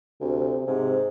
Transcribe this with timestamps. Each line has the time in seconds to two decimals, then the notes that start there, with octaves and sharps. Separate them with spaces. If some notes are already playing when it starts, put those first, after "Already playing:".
0.21 D2 C3
0.67 G#2 C3